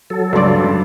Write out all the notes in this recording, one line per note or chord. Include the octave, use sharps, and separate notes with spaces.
F#3 A4
C#2 G2 D5 C6
F#2